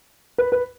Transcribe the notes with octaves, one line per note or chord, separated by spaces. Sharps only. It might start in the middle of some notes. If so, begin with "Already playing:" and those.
B4
B4